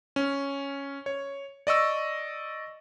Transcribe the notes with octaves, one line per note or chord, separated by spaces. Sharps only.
C#4
C#5
D5 D#5 C#6 E6